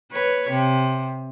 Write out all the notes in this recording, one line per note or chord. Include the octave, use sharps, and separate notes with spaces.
B4 C#5
C3